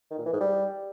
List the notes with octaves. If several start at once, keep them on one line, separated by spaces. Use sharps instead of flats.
D#3
A#2
E3
G#2
G3